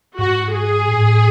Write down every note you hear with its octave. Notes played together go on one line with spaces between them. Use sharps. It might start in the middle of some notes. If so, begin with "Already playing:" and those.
G#2 F#4
G#4
A2